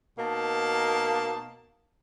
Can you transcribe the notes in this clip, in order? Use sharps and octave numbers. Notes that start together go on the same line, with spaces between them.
B2 A#3 D#4 A5